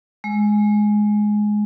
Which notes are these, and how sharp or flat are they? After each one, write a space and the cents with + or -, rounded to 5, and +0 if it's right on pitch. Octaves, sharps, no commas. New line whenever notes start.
G#3 +10